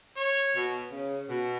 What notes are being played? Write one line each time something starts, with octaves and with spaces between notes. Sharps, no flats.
C#5
B2
C#3
B2